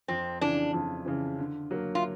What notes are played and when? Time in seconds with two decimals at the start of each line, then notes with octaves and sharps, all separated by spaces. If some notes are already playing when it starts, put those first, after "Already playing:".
0.08 F2 C4
0.41 C#3 E3 D4
0.74 F2
1.06 C#3 E3
1.39 D3
1.71 F#3 A#3
1.95 F4